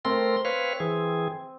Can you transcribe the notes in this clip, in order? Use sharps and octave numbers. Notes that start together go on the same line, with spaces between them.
A3 C4 A#4 C6
B4 C#5 F5
E3 G#4